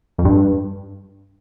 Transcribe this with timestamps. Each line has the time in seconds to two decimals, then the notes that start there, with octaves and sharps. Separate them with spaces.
0.18 F2
0.25 G2